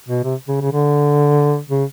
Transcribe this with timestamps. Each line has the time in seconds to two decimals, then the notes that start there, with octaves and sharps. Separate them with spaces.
0.08 B2
0.24 C3
0.48 C#3
0.61 C#3
0.72 D3
1.70 C#3